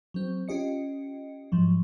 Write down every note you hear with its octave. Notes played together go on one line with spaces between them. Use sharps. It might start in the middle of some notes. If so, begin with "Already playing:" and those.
F#3 C4
C#4 F4 G4 D#5 C#7
G#2 F3 F#3